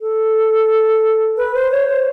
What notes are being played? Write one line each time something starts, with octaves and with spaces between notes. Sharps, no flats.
A4
B4
C5
C#5
C5